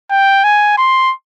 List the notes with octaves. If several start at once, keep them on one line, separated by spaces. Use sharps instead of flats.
G5
G#5
C6